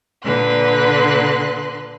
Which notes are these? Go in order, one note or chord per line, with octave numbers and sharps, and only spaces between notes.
A#2 D3 B4 C6 F#6